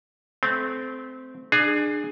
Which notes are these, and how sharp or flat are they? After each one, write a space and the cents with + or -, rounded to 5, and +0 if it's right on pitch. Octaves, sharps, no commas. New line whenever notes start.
A3 -25 C4 -20
D4 +30 G#4 +0